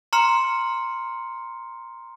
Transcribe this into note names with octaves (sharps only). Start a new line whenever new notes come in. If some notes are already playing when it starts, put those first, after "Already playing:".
A#5 C6 F6 C#7